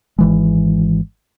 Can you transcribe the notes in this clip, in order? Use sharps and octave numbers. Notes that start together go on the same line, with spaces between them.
G#1 E3 G#3